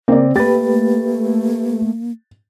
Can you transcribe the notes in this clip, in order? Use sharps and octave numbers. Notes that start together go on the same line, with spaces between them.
C#3 A#3 C4 D5
A3 A#3 G4 B4 A6